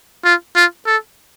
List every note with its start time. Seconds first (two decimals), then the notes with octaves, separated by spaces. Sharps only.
0.25 F4
0.56 F4
0.87 A4